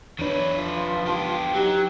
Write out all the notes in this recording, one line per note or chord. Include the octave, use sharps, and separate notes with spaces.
E2 D#3 D4 B4 C#5
F3
B3 G4
F#3 D#4 G4